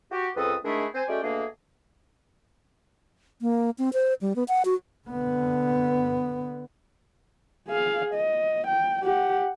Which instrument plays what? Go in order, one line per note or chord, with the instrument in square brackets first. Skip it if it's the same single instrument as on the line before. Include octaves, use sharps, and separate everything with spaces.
[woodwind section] F#4 G4
C#2 C4 A4 B4 D#6
D#3 G#3 A3 D4 E4 G#4
C4 C5 G#5
G#3 A3 C#4 F#4 D5 G5
B2 A3 A#3 D4 G#4
[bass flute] A#3
C4
C5
G3
B3
F#5
F#4
[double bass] D3 B3
[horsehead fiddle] G#4 F5
D#5
G5
G4 F#5